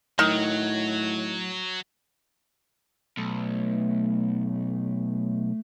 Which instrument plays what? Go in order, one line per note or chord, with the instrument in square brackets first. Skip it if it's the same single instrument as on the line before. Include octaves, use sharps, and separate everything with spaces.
[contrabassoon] A2 [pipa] D#3 [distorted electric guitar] F#3
[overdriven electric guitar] B1 [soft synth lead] A3